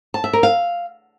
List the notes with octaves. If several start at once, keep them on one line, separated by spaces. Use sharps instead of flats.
A5
E5
A#4
F5